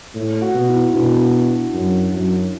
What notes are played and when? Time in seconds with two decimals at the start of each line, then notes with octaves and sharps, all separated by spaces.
0.15 A2
0.42 F#4
0.54 B2
0.68 E4
0.91 E4
0.95 B2 D4
1.74 F#2
2.13 F#2